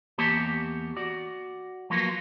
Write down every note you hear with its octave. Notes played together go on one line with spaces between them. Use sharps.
E2 A#3 G4 C#5 A5
F#4 D5
F3 F#3 A#3 B3 F4 F#4